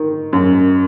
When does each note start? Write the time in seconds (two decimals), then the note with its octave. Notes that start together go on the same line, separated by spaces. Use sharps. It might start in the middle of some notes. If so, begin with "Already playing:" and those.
Already playing: D#3
0.33 F#2